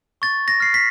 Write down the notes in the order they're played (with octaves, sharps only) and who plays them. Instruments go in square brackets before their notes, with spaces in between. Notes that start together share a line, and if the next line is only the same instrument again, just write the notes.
[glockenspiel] C#6 A6
A#6
F6 C7
B6